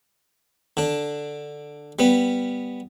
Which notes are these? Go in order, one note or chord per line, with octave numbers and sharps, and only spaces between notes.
D3 D4
G3 B3